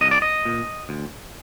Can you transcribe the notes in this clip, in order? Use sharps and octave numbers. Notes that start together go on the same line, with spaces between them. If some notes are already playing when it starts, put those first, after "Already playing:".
C2 D#5
D5
D#5
A#2
D2